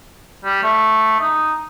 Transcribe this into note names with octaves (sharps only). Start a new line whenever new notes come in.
G3
A3
D#4